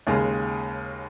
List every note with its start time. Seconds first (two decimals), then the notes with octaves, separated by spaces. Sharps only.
0.07 D#2 C#3 G#3